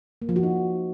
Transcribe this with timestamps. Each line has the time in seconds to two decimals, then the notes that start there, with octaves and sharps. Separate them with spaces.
0.22 A#3
0.29 F3
0.36 F#4
0.43 D#4